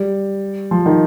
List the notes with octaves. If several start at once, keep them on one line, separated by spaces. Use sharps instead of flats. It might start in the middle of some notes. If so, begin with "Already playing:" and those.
Already playing: G3
F3
D#3